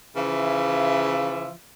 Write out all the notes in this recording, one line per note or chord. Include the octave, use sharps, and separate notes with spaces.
C#3 E3 F3 E5